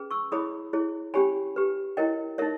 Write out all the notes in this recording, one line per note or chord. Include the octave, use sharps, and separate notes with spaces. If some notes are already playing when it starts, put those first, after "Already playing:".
Already playing: C#4 G#4 B4
C#6 E6
E4 G#4 C#5 B5 D#6
E4 G#4 C#5
C#4 G4 C#5 G#5 B5
G4 B4
E4 A#4 C#5 D#5 G5
D#4 A#4 C#5 E5